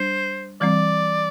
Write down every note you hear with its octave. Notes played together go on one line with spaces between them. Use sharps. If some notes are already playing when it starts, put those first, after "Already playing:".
Already playing: G3 D4 C5
E3 G3 C4 D5